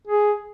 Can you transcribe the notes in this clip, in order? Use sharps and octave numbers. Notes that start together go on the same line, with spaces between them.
G#4